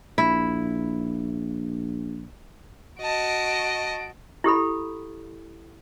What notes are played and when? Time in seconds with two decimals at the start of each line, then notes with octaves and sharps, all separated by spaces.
0.18 A#1 E4
3.01 F#4 D#5 A5 D7
4.44 E4 G4 A4 B5